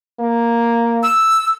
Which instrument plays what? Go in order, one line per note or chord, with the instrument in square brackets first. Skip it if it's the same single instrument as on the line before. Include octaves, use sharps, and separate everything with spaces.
[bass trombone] A#3
[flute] E6